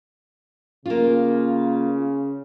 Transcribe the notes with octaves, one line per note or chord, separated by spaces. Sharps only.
C#3 A#3 F4